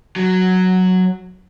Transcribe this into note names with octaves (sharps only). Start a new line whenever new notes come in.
F#3